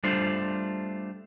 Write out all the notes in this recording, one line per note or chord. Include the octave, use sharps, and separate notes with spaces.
G3 A3 D4 F4 C5